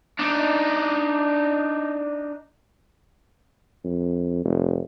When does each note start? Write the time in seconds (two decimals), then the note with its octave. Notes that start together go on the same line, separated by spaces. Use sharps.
0.19 D4 D#4
3.84 F2
4.45 F1